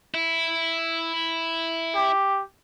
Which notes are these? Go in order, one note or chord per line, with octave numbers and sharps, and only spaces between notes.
E4
G4